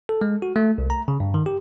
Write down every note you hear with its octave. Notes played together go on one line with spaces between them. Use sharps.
A4
G#3
F#4
A3
C2
A#5
C#3
G2
D#3
G4